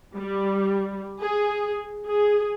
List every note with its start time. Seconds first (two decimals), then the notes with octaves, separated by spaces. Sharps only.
0.16 G3
1.20 G#4
2.06 G#4